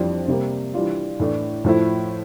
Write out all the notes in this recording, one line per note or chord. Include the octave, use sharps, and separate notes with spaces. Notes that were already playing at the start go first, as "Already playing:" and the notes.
Already playing: F2 E3 G3 D4 F4
C3 G3 A#3
E3 G3 D4 F4
A2 E3 A3 D4
A2 F3 A3 E4